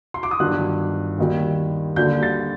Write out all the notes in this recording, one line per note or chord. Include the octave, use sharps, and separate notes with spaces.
C6
D6
D#6
G1 G2 D#3 F#3 F#6
D#2 D#3 G3
D#2 D3 G3 G6
A6